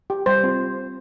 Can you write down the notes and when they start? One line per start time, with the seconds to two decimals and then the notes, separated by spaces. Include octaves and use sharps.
0.10 G4
0.26 G3 C5
0.43 C4 F4